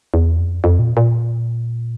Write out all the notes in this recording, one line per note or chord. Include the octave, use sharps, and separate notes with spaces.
E2
F2
F2
A#2
A#2